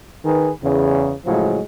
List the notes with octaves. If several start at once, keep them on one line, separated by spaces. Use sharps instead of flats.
D#3 G#4 B4
E2 C#3
A2 C#3 F3 F#3 G#3